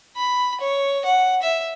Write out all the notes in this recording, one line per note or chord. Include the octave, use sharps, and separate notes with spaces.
B5
C#5
F#5
E5